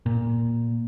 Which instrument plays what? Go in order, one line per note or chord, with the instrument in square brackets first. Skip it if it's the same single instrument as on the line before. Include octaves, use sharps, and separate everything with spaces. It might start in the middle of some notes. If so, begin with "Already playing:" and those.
[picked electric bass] A#2